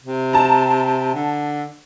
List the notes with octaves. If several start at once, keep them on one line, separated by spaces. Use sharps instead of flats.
C3
A5 A#5
D3